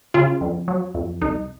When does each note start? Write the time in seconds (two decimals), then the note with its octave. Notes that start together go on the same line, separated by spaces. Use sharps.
0.14 C#3 F4
0.41 F2
0.68 F#3
0.95 F2
1.22 C2 D#4